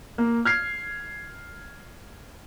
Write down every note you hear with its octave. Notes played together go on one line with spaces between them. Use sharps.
A#3
F6 G#6 C7